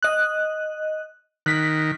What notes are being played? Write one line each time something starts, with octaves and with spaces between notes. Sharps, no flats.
D#5 F#6
D#3 F#6 B6